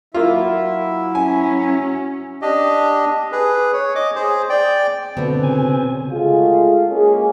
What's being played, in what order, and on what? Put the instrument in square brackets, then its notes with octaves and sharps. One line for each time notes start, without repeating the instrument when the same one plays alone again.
[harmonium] F#3 E4 E5 [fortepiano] A#3 F4
[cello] C#4 [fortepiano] G#5
[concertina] D4 G4 D#5
G#4 B4
C#5
D#5 D6
G#4 C5
D5 G5
[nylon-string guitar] B2 D4 [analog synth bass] D3 [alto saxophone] C4
[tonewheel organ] C#3 G#5
[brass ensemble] G#3 A3 F4 F#4 G#4
G#3 A#3 C#4 G#4